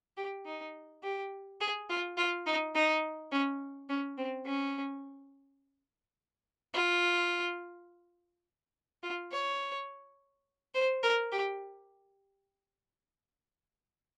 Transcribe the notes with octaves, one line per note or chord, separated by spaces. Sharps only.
G4
D#4
G4
G#4
F4
F4
D#4
D#4
C#4
C#4
C4
C#4
F4
F4
C#5
C5
A#4
G4